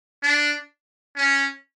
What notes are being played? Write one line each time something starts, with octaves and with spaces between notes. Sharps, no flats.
D4
C#4